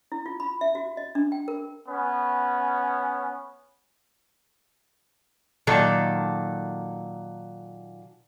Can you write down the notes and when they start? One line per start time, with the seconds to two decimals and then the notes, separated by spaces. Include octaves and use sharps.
0.12 E4
0.26 F4
0.40 B5
0.61 E5
0.75 F#4
0.97 D#5
1.15 D4
1.32 G5
1.48 A#4
1.88 B3 C#4
5.67 A#2 D#3 F#3 A4